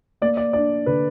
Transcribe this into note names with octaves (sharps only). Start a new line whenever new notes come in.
A#3 D5
D5
D4 D5
D3 B4